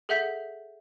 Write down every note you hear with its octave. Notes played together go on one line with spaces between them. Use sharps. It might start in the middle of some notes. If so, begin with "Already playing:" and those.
G#4 A4 E5 F#5 G6 B6